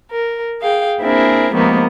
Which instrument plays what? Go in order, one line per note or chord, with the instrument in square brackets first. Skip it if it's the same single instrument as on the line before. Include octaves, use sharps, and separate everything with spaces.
[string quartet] A#4
G#4 F5 G5
A#3 C4 D4 E4 G#4 A#4
C3 D#3 F3 G#3 A#3 B3